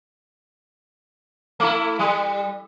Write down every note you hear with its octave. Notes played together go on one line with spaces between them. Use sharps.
A3 E4
G3